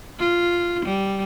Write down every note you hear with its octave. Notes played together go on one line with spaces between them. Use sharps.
F4
G3